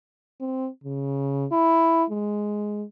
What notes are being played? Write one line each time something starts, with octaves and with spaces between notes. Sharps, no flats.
C4
C#3
E4
G#3